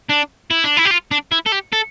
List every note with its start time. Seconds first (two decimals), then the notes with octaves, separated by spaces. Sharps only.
0.10 D4
0.51 E4
0.64 D4
0.77 E4
0.85 G4
0.91 F4
1.11 D4
1.32 E4
1.46 A4
1.52 G4
1.72 A4